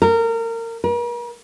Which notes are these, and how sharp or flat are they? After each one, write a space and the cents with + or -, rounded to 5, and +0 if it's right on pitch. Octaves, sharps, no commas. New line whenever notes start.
A#4 -25
A#4 +45